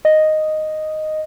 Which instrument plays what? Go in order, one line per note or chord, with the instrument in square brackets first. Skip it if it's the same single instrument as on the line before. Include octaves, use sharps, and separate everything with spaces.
[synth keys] D#5